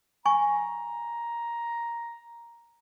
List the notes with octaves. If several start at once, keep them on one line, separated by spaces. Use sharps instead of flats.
G#5 A#5 C#6